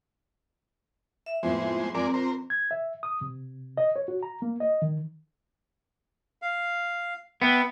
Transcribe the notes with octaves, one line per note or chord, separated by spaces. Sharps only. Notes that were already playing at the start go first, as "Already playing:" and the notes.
E5
F2 A2 G#3 B3 C5
F2 G#3 C4 A#4 D5
A#4 C5
G#6
E5
D#6
C3
D#5
C#5
F#4
A#5
A#3
D#5
D#3
F5
B3 B4 E5 G5